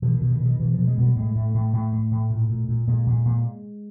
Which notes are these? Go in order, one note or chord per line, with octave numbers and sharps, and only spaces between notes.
B2 E3
B2 D#3
D#3
B2
D#3
B2 E3
F3
B2
G#3
B2 G3
A2 G#3
A2 A3
A2 A3
A2 A3
A2
A2
A#2
A#2
A#2
A#2 G#3
A#2
A#2